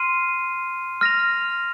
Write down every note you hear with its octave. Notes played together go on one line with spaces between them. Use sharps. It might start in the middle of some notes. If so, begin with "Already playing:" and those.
Already playing: C6 F6 C7 D#7
F6 A#6 F7